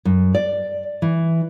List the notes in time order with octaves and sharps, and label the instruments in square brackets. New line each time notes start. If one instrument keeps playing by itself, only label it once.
[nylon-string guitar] F#2
D5
E3